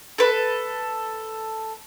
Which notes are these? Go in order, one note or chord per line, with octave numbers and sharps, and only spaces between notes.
A4 B4